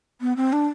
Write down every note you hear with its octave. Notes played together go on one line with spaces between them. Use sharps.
B3
C4
D4